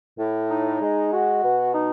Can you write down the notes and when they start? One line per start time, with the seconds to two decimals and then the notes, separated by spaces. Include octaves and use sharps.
0.19 A2
0.50 D#4
0.81 G#3
1.12 F#4
1.44 B2
1.75 D#4